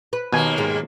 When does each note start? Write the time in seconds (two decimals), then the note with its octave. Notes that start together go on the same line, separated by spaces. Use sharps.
0.13 B4
0.33 D#2 B2 A#3 G#5
0.58 G#2 D#3 G#3